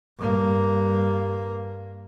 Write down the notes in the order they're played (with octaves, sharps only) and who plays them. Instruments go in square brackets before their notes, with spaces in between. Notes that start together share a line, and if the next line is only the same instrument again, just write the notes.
[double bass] G2 A#3